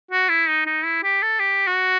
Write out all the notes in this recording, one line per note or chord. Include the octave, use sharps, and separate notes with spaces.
F#4
E4
D#4
D#4
E4
G4
A4
G4
F#4